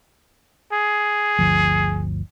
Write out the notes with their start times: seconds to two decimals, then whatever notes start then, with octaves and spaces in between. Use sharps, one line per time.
0.72 G#4
1.39 G1 D2 F3